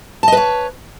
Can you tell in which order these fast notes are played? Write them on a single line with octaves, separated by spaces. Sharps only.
A5 D#5 B4 C#5